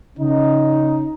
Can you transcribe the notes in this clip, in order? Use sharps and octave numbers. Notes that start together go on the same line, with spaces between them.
C#3 C#4 D#4